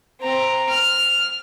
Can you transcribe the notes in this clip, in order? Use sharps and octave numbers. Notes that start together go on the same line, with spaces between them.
C4 A#5
F6